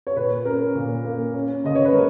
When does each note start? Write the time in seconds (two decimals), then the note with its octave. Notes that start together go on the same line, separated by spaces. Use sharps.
0.07 C#5
0.16 A#2 B4
0.45 C#4 A#4
0.75 A#2
1.05 A#3
1.34 C#4
1.64 C#3 D#5
1.75 C#5
1.85 B4
1.93 G#3 A#4